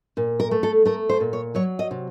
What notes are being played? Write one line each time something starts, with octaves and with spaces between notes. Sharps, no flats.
A#2
A#4
A3
A4
A3 A#4
C5
A#2
C#5
F#3 C#5
D#5
C3